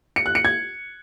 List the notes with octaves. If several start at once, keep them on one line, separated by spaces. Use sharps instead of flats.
C#7
F#6
C#7
G#6